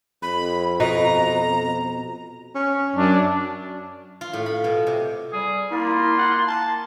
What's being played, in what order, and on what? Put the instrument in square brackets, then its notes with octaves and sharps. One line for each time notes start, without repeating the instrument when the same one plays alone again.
[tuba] F2 [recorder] B5
[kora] B2 B4 D#5 [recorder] A#5
[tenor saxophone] C#4
[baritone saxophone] F#2 [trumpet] D4
[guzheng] F4
A2
B5
B2
C3
[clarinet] G3 [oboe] G#4
[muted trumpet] A#3 [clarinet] E4 [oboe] F4 [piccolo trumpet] C6
[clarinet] F#5
A5